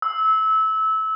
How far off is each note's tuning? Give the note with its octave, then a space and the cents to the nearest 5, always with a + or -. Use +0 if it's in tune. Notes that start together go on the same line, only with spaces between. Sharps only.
E6 -20